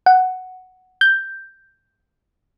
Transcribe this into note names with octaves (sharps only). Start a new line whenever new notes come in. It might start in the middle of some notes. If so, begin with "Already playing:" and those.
F#5
G6